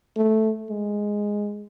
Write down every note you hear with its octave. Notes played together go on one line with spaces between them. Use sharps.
A3
G#3